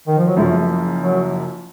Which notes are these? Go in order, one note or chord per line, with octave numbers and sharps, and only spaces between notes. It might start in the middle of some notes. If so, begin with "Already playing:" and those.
D#3
F3
F#3
F#1 F#2 C#3 F3 A3
F#3